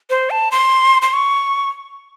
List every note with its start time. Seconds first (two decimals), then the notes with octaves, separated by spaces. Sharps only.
0.10 C5
0.30 A5
0.52 C6
1.02 C6
1.13 C#6